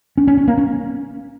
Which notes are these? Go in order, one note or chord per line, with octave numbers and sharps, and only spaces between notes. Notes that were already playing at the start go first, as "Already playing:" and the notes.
C#4
C#4
C#4
A#3
C#4